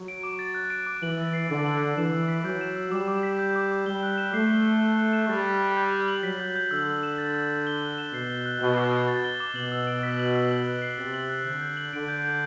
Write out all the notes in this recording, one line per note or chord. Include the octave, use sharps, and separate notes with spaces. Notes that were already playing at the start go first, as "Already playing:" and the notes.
Already playing: F#3
D7
D6
A6
F#6
D7
D6
E3 F#7
E6
C7
D3 A6
F#7
E6
E3 E7
E6
B6
F#3 G6
E7
E6
G3 D6
D6
B6
G6
D6
D6
G3 G7
F#6
E7
A3 C7
G7
F#6
F#6
F#6
E7
G3 A6
F#6
F#6
G6
G6
F#7
F#3 B6
G6
G6
D3 E6
E6
E7
A6
E6
E6
G7
F#6
E7
B2 C7
G7
F#6
B2 G7
D6
C7
A6
G7
D6
B2 F#7
E6
D7
B6
F#7
E6
F#7
F#6
C7
C3 A6
F#7
F#6
D3 G6
G6
F#7
D3 D7
G6
G6